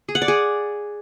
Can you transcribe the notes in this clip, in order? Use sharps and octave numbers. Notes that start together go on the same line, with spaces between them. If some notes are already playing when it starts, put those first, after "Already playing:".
G#4
F#5
D5
G#4